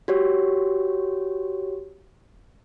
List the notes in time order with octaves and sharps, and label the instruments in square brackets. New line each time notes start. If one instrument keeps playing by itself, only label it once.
[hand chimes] F#4 G4 C#5